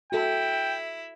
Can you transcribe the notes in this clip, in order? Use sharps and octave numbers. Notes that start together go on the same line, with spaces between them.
E4 F#4 A4 G5